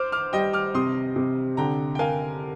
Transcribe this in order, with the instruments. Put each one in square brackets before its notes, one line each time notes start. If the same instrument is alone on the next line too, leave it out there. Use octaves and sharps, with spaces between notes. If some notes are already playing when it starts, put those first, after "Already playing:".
Already playing: [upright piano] C5 [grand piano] D6 F6
[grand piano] D6 F6
[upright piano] G3 [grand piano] D#5 G5
[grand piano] D6 F6
[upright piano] C3 [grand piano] C6 D#6
[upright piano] C3
[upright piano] D3 [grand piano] G5 A#5
[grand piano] G5
[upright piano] A#4 [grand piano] F5 G#5